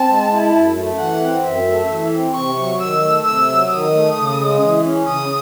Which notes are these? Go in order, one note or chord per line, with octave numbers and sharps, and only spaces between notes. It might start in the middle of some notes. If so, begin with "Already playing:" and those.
Already playing: C4 A5
G#3
E4
F#2
A3
E3 F#5
C4
F#2 E5
A3
E3
C4
C3 C#6
F#3
D#3 E6
A3
C3 E6
F#3
D#3 D#6
A3
C#3
G#3
E3
C#4
C#3 D#6